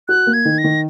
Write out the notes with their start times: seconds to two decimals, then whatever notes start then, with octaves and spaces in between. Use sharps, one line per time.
0.08 F#4 F#6
0.27 A#3
0.33 G#6
0.45 D#3
0.58 A#6
0.64 D#3